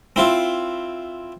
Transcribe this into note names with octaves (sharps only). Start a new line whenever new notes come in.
C4 E4 F4